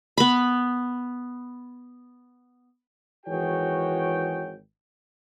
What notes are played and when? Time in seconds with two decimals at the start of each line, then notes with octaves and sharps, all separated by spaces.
0.17 B3 B5
3.26 G#1 E3 F#4 G#4 C#5 G5